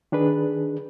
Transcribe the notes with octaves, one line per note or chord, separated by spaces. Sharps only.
D#3 D4 G#4 B4